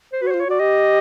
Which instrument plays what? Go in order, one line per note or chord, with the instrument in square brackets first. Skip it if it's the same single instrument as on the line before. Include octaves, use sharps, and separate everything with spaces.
[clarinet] C5
[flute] F#4 [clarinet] B4
[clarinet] C#5
[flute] F4 [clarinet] C5
[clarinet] C#5
[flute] F#4 [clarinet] D5
[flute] G4 [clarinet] D#5